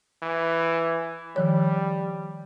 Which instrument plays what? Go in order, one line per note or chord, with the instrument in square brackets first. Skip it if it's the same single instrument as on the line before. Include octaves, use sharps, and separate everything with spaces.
[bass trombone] E3
[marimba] D#3 F3 C#5 [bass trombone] G3